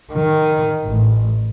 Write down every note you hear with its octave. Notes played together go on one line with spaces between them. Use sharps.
D#3
A1